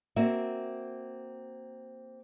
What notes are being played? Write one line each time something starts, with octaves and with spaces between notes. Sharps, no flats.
A#3 C4 F#4 E5